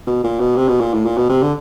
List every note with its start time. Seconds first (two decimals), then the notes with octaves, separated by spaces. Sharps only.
0.07 B2
0.24 A#2
0.40 B2
0.56 C3
0.68 B2
0.80 A#2
0.93 A2
1.05 A#2
1.17 B2
1.29 C3
1.42 D3